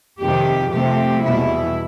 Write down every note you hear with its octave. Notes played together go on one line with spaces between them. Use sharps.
F2 C3 D#3 G4
C3 F3 A3 C4 G4
E2 B2 G3 E4